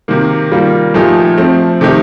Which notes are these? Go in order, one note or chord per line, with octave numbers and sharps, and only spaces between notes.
C3 D#3 A#3
D#3 G3 A#3 F4
A#2 F3 A3 D#4 G4
F3 A3 C4
C3 D#3 A3 D#4 G4